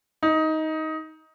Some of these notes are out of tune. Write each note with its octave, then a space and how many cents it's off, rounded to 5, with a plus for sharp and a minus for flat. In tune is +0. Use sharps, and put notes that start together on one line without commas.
D#4 +15